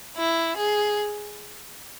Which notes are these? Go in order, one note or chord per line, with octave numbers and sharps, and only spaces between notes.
E4
G#4